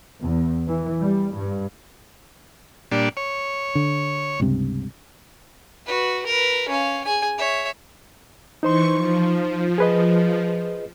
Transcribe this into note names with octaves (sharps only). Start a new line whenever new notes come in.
E2
E3
G3
G2
A#2 G3 D4
C#5
D3
C#2 G2 C3
F#4 B4
A#4 B4
C#4 F5
G#4 G#5
C#5 E5
E3 D#4 C5 C6 C#6
F3
G#4 B4 D#5